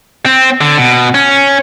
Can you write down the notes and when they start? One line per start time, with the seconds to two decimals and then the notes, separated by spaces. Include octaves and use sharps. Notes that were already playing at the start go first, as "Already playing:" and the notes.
0.25 C4
0.61 D3
0.77 B2
1.14 C#4